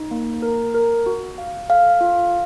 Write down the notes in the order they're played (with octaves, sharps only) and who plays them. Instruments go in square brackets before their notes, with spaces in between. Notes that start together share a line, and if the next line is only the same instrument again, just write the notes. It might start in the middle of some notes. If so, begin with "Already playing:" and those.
Already playing: [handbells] D#4
A#3
A#4
A#4
F#4
F5
[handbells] A4 [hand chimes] F5
[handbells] F4